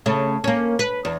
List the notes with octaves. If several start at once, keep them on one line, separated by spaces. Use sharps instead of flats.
C#3 A3
A#3 C#4
B4
E2